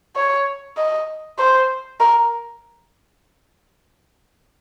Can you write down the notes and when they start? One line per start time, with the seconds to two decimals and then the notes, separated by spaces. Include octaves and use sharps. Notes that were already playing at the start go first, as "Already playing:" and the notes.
0.16 C#5
0.77 D#5
1.39 C5
2.00 A#4